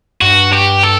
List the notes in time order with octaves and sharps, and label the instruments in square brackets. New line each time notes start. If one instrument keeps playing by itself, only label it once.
[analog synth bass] G2 [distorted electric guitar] F#4
[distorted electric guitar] G4
A4